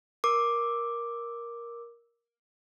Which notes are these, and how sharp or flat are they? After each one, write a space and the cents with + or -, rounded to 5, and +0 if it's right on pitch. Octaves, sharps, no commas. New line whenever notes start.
A#4 +10 D6 +0